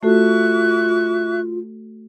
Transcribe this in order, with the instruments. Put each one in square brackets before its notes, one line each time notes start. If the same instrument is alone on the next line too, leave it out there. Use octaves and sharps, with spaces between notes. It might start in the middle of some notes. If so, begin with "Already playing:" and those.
[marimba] A3 F#4 A4 [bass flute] F4 [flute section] E5 C#6 F#6